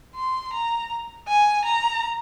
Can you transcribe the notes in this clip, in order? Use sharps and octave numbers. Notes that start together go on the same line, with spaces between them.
C6
A#5
G#5
A#5